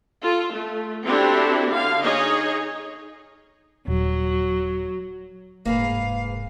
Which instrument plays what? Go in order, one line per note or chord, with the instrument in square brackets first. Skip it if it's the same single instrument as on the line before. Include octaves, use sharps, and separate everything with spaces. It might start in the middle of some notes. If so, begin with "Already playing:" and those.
[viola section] F4 A4
A3
C4 D4 E4 F#4 G4 A4
D3 F5
D#4 G#4 C#5 D#5
[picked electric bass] D#1 [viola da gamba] F#3
[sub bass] F1 [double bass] G#2 [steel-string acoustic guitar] A#3 G#4 B4 [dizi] F5